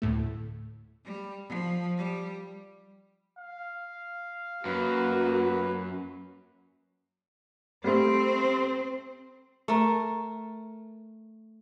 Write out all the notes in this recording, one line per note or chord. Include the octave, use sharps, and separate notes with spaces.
D2 A2 A3
G3
F3
G3
F5
F#2 A#3 F#4 B4
G3 A3 C4 C5
A3 A#4